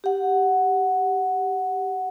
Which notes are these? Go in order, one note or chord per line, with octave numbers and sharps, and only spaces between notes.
G4 F#5